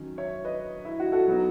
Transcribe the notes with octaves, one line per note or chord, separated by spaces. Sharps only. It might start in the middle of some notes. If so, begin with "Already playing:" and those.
Already playing: D#3 F#3 C#4
C#5 E5
B4 D#5
E4
F#4
F#4 A4
F#3 B3 D#4